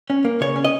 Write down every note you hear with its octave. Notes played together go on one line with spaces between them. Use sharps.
C#4
A#3
C#3 C#5
C#4
D#5